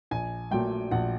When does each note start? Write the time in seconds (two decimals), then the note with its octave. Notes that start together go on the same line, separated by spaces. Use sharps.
0.11 A#1 G#5
0.51 A#2 F#3 A3 G5
0.91 A#1 F#5